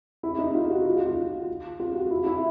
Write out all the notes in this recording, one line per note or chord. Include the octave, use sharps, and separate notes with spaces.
E4
D#4
F4
F#4
F4
F4
F4
F4
F#4
E4
E4